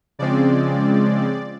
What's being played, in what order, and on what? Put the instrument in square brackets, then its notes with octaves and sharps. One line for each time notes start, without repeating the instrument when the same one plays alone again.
[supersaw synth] C#3 F3 G#3 C4 D5